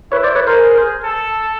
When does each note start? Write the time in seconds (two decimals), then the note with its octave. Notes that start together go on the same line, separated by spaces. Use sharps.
0.12 E4 B4 C#5
0.23 C5 D5
0.35 B4 C#5
0.47 A#4 C5
0.58 G#4
1.04 A4